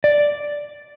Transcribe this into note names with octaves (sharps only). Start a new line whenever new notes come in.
D5